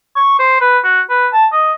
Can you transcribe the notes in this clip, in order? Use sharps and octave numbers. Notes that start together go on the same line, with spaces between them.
C#6
C5
B4
F#4
B4
A5
D#5